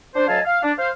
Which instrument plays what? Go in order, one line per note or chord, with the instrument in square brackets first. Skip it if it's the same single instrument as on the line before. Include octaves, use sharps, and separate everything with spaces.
[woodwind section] D4 C5
D2 F#3 D#5 F5 G#5 A5
F5
D4
C5 F5